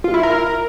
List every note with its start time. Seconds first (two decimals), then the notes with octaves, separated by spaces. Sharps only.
0.04 F4
0.14 E4
0.23 A#4